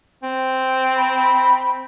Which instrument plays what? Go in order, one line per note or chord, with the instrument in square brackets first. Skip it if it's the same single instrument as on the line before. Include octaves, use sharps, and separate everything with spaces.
[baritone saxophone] C4
[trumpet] B5